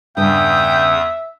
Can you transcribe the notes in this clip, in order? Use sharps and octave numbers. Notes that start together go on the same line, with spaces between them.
E2 G2 C#3 E5 G5 D#6